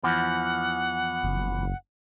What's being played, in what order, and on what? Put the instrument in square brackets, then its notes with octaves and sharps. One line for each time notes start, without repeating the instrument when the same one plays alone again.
[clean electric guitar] E2 E3 F3 [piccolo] F#5
[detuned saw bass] F#1